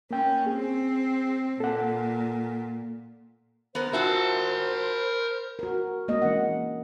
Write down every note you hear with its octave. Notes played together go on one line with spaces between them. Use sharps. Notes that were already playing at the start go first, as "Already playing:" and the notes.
A#3 C#4 G5
C4 G#4
A#2 A4 F#5
B3 A#4 C5
F4 F#4 A#4 E5 A5
F#4 A#4
G#3 A#3 C4 D#5
E3 C#4 F#5